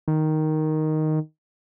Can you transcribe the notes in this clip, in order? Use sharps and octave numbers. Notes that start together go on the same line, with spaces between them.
D#3